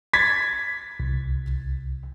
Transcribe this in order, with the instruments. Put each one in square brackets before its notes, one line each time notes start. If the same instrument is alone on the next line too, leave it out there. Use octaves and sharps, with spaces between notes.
[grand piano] G#6 A6 B6
[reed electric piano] C2